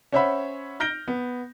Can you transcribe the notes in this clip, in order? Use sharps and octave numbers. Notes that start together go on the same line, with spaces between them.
C#4 C5 C#5 E5 F#5 B5
F6 G6 A#6 D7 G7
B3